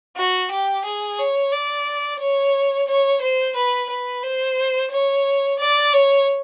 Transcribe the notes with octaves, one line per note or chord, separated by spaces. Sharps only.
F#4
G4
G#4
C#5
D5
C#5
C#5
C5
B4
B4
C5
C#5
D5
C#5